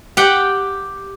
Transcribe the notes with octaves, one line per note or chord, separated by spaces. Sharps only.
G4 F#5 G5